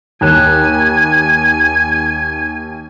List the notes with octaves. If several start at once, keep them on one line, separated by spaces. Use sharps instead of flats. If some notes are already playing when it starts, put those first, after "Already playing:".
D#2 G#5 F#6 E7